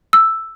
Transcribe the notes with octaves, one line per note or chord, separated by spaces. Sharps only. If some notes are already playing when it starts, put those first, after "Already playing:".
E6